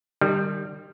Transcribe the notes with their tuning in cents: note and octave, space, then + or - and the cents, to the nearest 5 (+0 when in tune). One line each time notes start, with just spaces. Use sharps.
D#3 -35 G3 +0